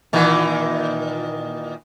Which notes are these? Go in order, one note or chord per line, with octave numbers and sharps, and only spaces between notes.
A#2 D#3 E3